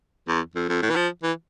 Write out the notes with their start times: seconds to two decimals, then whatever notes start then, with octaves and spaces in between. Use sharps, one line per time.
0.28 E2
0.55 F2
0.69 F2
0.82 A2
0.90 E3
0.96 F3
1.23 E3